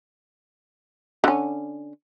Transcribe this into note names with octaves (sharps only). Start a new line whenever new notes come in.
D3 C#4